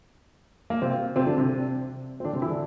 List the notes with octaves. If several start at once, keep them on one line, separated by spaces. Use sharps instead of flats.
A#3
C3 C4
C3 C4
D3 D4
C3 C4
C4
D3 D4
C3 C4
E3 E4
D3 D4